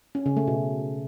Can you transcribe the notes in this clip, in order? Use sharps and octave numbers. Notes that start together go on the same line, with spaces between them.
C#4
C#3
A3
B2